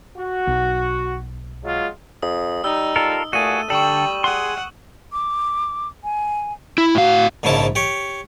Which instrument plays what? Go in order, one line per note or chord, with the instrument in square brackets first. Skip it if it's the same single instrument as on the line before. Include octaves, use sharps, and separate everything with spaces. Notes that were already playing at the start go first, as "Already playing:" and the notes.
[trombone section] F#4
[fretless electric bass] B1
[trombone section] F#3 G#3 F4
[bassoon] F2 [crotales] D#6
[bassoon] G3 [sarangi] D#4 [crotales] E6
[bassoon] G3 [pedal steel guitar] F4 A4 A#4
[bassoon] A#2 [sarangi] A3 [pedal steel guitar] F#4 G#4 [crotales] D#7
[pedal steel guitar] D3 A4 [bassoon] G3 [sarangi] G5 [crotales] C#6 F#7
[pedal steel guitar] G#4 C6 [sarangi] F#5
[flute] D6
G#5
[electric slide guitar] E4 [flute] B5
[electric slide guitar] A2 F5 [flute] F#4
[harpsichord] A#1 G#2 C#3 F3 E4 A5
G4 C#5